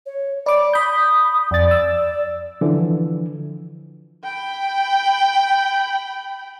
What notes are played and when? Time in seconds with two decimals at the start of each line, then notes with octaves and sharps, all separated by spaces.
0.06 C#5
0.46 D5 B5 D6
0.73 B5 D#6 G6
1.51 F2 D5 A6
1.71 E6
2.61 D3 E3 F3
4.24 G5 B5